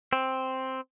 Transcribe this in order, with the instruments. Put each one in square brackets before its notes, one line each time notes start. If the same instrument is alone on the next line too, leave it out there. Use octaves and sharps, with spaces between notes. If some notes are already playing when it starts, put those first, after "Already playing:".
[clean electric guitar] C4